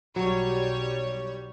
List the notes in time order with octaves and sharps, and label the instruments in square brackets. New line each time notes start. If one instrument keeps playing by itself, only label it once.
[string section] B1 G3 C#5 [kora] F#3